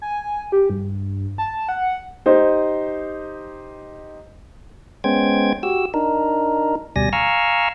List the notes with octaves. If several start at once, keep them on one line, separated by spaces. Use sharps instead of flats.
G#5
G4
G2
A5
F#5
D#4 G4 C5
G#3 B3 C#4 C5 G5 G#6
F#4 G4 E6
D4 D#4 A#4
D2 B2 G3 D5 G#5 A#6
F5 G#5 A#5 C#6 E6 F6